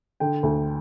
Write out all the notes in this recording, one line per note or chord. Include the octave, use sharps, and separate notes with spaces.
D3 G5
D2